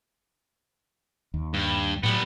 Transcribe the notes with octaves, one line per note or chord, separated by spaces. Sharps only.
D#2
G2
A2 F#3 G3 B3